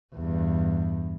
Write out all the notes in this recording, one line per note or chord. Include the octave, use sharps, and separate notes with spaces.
E2 G2